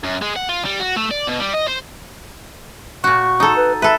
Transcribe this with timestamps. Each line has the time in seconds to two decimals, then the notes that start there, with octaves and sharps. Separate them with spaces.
0.04 F#2
0.22 G#3
0.36 F#5
0.49 F4
0.65 G3
0.79 F#4
0.96 A3
1.11 D5
1.27 B2
1.39 G3
1.53 D#5
1.68 C5
3.04 A#2 F#4 C#6
3.40 D#4 A4
3.56 B4
3.82 A4 B4 E5